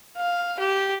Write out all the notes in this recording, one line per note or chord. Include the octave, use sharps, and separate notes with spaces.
F5
G4